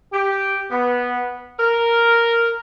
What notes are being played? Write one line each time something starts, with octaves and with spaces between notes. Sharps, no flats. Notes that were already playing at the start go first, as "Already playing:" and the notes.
G4
B3
A#4